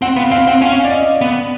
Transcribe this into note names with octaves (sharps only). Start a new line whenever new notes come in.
C4 F#5
B3 F5
C4 F5
C4 F#5
C#4 F5
D5
D#5
B3